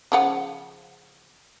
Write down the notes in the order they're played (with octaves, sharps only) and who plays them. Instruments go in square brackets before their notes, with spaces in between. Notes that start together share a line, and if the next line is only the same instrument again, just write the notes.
[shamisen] C#3 F3 F#5